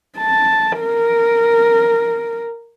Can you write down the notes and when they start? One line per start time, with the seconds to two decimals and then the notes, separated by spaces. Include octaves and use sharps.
0.18 A5
0.81 A#4